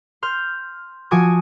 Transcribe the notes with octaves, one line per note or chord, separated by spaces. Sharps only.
C6 F6 G6
F3 F#4 G#5 D6 D#6 G#6